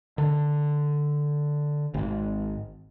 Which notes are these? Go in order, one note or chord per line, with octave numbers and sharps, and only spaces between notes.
D3
G#1 G#2